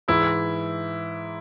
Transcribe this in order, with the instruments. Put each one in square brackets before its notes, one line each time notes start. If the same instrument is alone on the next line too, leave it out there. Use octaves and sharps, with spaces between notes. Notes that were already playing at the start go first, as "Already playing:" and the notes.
[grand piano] G#2 E3 E4